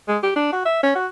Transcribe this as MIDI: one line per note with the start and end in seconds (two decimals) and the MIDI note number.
0.08 0.18 56
0.23 0.31 67
0.36 0.52 62
0.53 0.63 66
0.65 0.82 76
0.83 0.92 61
0.95 1.07 66